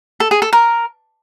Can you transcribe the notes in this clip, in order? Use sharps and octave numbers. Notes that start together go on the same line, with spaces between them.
A4
G#4
A4
A#4